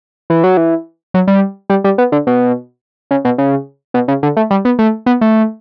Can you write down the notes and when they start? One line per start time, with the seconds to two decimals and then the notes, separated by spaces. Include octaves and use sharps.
0.30 E3
0.44 F#3
0.57 E3
1.14 F#3
1.27 G3
1.70 G3
1.84 G3
1.98 B3
2.12 D3
2.27 B2
3.11 C#3
3.25 B2
3.38 C#3
3.94 B2
4.08 C#3
4.23 D3
4.37 A3
4.51 G3
4.65 B3
4.79 A3
5.06 B3
5.21 A3